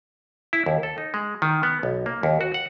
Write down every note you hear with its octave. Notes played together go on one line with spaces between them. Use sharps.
E4
D#2
A4
D#4
G#3
D#3
B3
B1
A#3
D#2
F#4
F#5